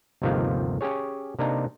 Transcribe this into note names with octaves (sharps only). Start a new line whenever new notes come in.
G1 D#2 C3 D#3 F3 F5
C#4 G4 G#4 C#5
C3 A#3 D4 D#4 A#5